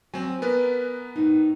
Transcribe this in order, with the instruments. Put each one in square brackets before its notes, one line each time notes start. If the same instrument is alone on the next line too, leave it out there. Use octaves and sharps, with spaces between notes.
[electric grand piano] F#3 C4 [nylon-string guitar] G#5
[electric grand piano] B3 A#4 B4
[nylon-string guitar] A2 D#4